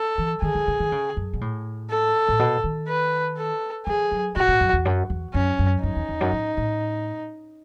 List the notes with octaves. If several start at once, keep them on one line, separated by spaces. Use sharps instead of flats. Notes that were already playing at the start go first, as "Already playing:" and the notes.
Already playing: A4
E3
D#3 G#4
D#3
C#3
D#3
C#3
F#2
B2
A2
A4
A2
B2
D#3
B4
A4
E3 G#4
F#3
B2 F#4
A2
F#2
E2
F#2
E2
F#2 C#4
F#2
F#2 D#4
E2
E2
F#2
A2
A2